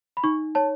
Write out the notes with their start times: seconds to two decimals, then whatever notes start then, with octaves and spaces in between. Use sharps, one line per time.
0.17 B5
0.24 D#4 C#6
0.55 C#5 A5